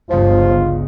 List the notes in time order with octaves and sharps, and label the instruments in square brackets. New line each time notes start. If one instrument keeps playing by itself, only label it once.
[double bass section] G1 [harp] C#2 G2 C#3 [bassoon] F3 [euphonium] F4